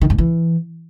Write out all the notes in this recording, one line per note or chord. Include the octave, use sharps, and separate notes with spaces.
D#3
G2
E3